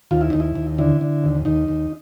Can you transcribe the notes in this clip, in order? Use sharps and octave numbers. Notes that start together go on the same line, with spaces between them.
D#2 F4
E4
D#2 D#4
E4
D#2
D3 E4
D3
D#2
D#2 D#4
D#2